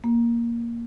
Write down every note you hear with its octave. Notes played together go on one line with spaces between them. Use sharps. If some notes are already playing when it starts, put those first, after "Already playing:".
A#3